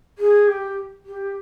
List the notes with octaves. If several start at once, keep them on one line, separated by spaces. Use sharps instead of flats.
G#4
G4
G4